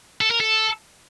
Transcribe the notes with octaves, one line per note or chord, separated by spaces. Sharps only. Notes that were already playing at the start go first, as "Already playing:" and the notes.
A4
A#4
A4